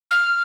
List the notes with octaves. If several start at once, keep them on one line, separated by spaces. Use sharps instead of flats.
F6